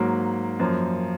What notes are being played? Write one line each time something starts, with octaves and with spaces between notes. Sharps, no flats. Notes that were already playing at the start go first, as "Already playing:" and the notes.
Already playing: G#2 F#3 A#3
F#2 F3 A#3